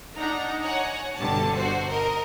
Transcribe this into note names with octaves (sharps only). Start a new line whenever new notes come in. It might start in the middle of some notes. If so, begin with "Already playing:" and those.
D4 D#4 F#5 A#5
C#5 F#5 G#5 A#5
G1 G2 B2 D3 G4 A5
F#4 C5
A#4 D#5